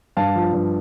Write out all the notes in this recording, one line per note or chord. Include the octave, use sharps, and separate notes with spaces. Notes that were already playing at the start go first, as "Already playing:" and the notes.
G2 F5 A5
F3
G2